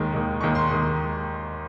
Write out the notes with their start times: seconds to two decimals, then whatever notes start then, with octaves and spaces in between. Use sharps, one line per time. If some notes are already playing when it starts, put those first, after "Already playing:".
Already playing: D#2 D#3 G#3
0.12 D#2 D#3 G#3
0.41 D#2 D#3 G#3 C#6
0.55 C6
0.69 D#2 D#3 G#3